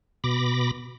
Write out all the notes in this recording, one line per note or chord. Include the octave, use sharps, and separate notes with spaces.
B2 B5 D6 A#6